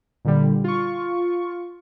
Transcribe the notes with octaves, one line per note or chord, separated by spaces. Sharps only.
A#2 D3 G3
F4 C#6